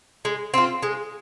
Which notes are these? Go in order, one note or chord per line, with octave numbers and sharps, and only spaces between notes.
G#3
C4 F4
G#3